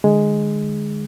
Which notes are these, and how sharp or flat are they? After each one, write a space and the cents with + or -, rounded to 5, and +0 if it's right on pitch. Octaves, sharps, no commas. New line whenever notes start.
D3 +40 G#3 +0